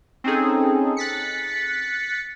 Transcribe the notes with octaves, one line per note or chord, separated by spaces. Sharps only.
C4 C#4 D#4 G#4 A4
F#6 A6 B6 C#7